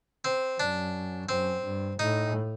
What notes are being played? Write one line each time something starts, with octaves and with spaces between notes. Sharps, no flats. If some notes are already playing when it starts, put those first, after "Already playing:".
C4
F#2 D4
F#2 C4
G2
A2 D#4